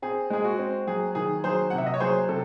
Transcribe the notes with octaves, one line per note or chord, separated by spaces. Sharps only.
C4 G#4
G#3 G#4
F#4
C4
F#3 G#4
D#3 G#4
F#3 G#4 C5
C3 F#5
E5
D#5
C#5
F#3 G#4 C5
C3 A4